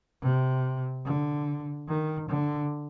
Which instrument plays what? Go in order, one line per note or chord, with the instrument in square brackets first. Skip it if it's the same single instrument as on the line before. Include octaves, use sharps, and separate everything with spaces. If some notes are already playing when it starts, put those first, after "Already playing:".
[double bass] C3
D3
D#3
D3